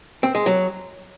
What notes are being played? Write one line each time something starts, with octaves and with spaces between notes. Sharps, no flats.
C4
G#3
F#3